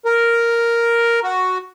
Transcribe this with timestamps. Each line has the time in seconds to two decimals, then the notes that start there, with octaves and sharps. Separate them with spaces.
0.05 A#4
1.24 F#4